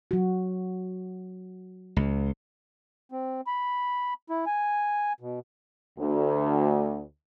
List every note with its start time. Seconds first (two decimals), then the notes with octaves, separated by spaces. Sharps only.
0.11 F#3 F#4
1.96 C#2
3.12 C4
3.47 B5
4.30 E4
4.46 G#5
5.20 B2
5.99 D2